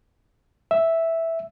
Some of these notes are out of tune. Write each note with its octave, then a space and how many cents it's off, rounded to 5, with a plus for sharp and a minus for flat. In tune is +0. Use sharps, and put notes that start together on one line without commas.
E5 -5